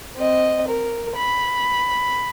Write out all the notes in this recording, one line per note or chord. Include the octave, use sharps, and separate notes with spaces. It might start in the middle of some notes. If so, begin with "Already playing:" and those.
C4 D#5
A#4
B5